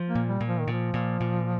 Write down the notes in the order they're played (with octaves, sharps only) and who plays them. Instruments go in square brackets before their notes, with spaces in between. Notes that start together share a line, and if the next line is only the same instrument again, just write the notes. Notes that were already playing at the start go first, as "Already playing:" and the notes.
Already playing: [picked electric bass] F3
[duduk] A#3
[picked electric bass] A#2
[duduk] G3
[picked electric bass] A#2
[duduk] F3
D#3
[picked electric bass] A#2 [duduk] F3
[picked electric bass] A#2
A#2